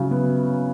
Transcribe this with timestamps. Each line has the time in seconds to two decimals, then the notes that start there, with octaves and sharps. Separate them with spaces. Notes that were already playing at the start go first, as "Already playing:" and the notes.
Already playing: C#3 F#3 E4
0.11 B3